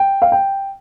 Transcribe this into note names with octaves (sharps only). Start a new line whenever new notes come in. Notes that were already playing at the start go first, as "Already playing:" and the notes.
Already playing: G5
F5
G5